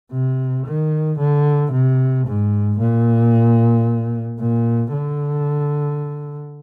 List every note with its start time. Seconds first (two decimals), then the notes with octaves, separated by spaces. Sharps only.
0.12 C3
0.67 D#3
1.19 D3
1.72 C3
2.26 G#2
2.80 A#2
4.40 A#2
4.93 D3